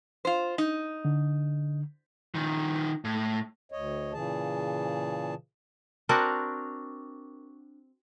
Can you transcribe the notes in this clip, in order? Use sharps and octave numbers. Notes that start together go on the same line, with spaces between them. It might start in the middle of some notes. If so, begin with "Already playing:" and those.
F4 C5
D#4
D3
D#3 F3
A2
D2 C#5 D#5
A#2 C#3 E3 G#4 A5
C4 D4 F#4 A#4